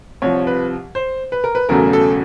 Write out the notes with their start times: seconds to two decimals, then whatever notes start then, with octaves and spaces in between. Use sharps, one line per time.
0.22 C2 C3 F3 C#5
0.47 B4
0.95 C5
1.32 B4
1.44 A#4
1.55 B4
1.69 E1 E2 C#3 F#3 A3 A#4
1.93 A4